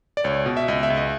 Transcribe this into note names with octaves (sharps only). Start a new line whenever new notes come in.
D5
C#2 C#5
B2
E5
C#2 D#5
E5
C#2
D#5